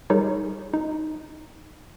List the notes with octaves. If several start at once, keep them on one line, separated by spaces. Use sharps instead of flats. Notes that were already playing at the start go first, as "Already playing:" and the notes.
G3 D#4 G#4 A#4 C#5 D5
D#4